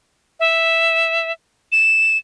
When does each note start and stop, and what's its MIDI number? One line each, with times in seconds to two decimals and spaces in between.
0.40 1.32 76
1.72 2.17 100